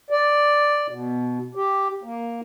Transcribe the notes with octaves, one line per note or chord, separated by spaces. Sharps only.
D5
B2
G4
A#3